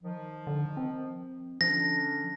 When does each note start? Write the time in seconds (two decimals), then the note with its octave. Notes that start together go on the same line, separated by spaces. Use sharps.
0.03 D#3 F3
0.47 D3
0.77 C4
1.61 D3 F3 C#4 D4 A#6